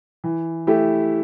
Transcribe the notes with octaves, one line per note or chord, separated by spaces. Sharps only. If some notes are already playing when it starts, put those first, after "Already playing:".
E3
A3 E4 G4